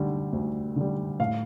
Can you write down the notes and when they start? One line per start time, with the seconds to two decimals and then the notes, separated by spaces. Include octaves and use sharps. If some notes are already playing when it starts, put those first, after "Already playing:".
Already playing: D2 D3 G3
0.33 D2
0.76 D3 G3
1.19 A2 F5